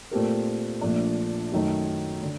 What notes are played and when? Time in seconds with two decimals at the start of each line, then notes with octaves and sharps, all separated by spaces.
0.11 A#2 A3 C4 G4 A#4
0.81 A#1 A#2 A3 D4
1.52 F#2 D#3 A3 D#4 F#4
2.23 D3